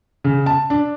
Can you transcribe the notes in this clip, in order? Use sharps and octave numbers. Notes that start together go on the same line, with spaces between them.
C#3
A5
D4